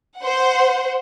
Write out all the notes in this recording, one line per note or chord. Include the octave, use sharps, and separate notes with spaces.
C5 F#5